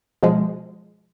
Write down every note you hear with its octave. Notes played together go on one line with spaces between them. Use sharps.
B2 F3 G#3